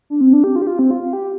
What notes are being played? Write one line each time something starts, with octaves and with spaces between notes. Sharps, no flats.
D4
C4
D4
G4
F4
G4
F4
C4
F4
F4
G4